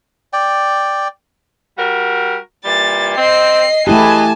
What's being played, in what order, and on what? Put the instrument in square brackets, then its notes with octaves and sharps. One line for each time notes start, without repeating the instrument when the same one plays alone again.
[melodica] D5 G5
[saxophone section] G3 F#4 A#4
[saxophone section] A#2 E3 G3 [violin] A6
[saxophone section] C4 [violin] D#5 C7
[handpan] A3 E4 G4 [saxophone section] G#4 B4 D#5 [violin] G#5 A5